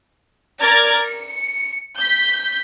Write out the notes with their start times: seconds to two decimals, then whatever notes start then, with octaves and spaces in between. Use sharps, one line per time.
0.60 A#4 D5 A#5 G#6 A6
1.05 C#7
1.97 G6 B6